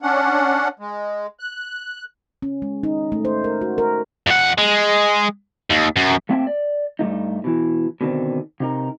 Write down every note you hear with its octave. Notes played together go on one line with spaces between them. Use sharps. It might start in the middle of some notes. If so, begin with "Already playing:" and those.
C#4 D4 F#5
G#3
F#6
C#4
G#3
D#4
A3
C5
A#4
F#4
A#4
F2 F#5
G#3
D#2
F#2
A3 A#3 C4 E5 G5 A5
D5
G2 C3 A3 D#4
B2 E3
B2 D3 D#3 C4
C3 D#4 A#4